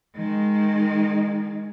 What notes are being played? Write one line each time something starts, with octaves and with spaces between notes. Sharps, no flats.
D#3 G#3